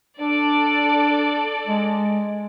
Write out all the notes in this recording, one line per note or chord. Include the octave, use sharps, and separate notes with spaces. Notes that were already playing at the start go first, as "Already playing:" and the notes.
D4 A4 D5
G#3